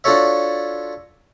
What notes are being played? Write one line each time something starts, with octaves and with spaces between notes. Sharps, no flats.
D4 F4 F#4 A4 C#5 E5